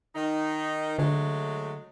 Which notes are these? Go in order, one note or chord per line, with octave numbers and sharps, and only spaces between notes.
D#3 D#4
D3 F#3 G#3 A3